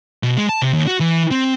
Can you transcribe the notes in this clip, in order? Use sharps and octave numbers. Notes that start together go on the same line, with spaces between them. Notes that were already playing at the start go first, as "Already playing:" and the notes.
B2
G#3
A5
C3
D#2
F#4
E3
C4